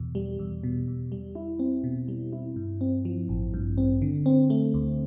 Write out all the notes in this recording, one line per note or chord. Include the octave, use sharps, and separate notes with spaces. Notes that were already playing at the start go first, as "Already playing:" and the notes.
Already playing: E2 B2
G3
E2
B2
E2
G3
E4
C4
B2
G3
E4
G2
C4
F3
A1
G2
C4
D3
C4
A3
D2